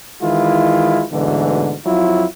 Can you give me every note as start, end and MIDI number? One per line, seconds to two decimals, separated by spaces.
0.23 1.04 51
0.23 1.04 52
0.23 1.04 56
0.23 1.04 64
0.23 1.04 65
1.13 1.75 38
1.13 1.75 44
1.13 1.75 47
1.13 1.75 50
1.13 1.75 52
1.86 2.26 41
1.86 2.26 54
1.86 2.26 64
1.86 2.26 65